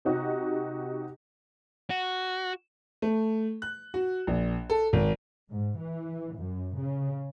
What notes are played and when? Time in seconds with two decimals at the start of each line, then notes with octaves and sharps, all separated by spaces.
0.05 C3 D#4 F#4 G4
1.90 F#4
3.02 A3
3.62 F#6
3.94 F#4
4.27 A#1
4.70 A4
4.93 G#1
5.51 G#2
5.79 E3
6.37 F#2
6.77 C#3